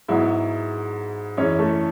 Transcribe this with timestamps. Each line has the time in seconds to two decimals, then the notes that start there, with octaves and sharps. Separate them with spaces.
0.08 G#2 F#3 B3 E4 E5
1.37 F#2 E3 G#3 C#4 C#5
1.59 A3 A4